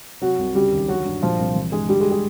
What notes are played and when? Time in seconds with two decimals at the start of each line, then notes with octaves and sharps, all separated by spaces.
0.21 C3 F#3 F#4
0.39 C2
0.55 C#3 G3 G4
0.72 D#2
0.88 D3 F#3 F#4
1.05 G2
1.22 A#2 F3 F4
1.39 C2
1.55 E3
1.72 G2 G#3 G#4
1.89 D3 G3 G4
2.00 G#3 G#4
2.12 G#3 G#4